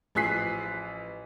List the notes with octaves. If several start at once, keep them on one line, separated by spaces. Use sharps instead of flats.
A1 F3 G#5 F#6 B6 C7